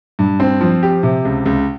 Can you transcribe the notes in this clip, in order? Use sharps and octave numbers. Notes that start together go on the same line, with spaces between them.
G2
C4
F3
G4
C3
C#2
C#2